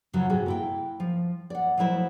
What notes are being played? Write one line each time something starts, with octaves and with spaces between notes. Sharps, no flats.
F#2 C#3 F3 F#3
A2 C3 F#4 G#4 A4
A#3 E4 G5
F3
D5 F#5
F3 F#3 A3 E4 C5